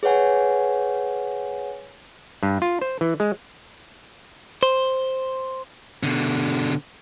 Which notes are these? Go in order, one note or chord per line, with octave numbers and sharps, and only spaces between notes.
G#4 B4 C#5 F#5 G#5
G2
F4
C5
E3
G#3
C5
B2 D3